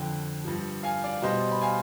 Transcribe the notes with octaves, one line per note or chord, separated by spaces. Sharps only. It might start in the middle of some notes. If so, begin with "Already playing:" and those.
Already playing: F2 D3 F3 G5
G2 F3
F5 G#5
D5 F5
B2 G3 C5 D#5
B5
F5 G#5